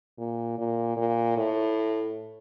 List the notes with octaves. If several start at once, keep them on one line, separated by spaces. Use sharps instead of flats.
A#2
A#2
A#2
A2